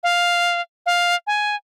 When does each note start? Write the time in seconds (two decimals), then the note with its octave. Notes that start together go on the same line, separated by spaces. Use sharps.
0.03 F5
0.86 F5
1.27 G#5